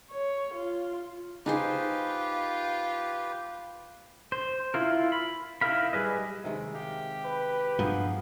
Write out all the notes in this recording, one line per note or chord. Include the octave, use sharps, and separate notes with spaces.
C#5
F4
D#4 F4 G4 G#4 B4 C5
C5
E4 F4 A#4
B5
D#4 E4 A#4 F5 B5
G3 G#4 B4 D#5
C3 D#3 G#3
G4 F5
B4
G2 F3 A#3 B3 G#4